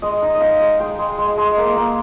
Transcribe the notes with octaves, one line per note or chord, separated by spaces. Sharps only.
G#3 D#5
D#4
D#5
D#4 F5
G#3
G#3 G5
G#3
G#3
G#3
A#3
A#3